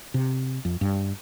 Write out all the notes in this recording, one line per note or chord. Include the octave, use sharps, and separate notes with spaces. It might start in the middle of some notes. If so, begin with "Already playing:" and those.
C3
F2
G2